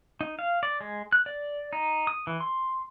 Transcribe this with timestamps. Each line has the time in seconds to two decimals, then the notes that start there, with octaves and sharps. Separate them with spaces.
0.21 D#4
0.39 F5
0.63 D5
0.81 G#3
1.13 F#6
1.26 D5
1.73 D#4
2.07 D#6
2.27 E3
2.40 C6